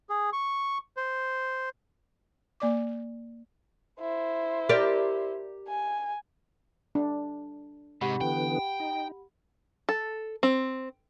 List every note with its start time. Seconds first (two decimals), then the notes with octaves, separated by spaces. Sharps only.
0.09 G#4
0.33 C#6
0.97 C5
2.60 A#3 D5 D6
4.00 E4 C5
4.69 G4 A#4 D5
5.68 G#5
6.95 D4
8.01 G#2 C3 D#4 G4 F#5 B5
8.21 D3 E3 B3 G5
8.80 D#4
9.89 A4
10.43 C4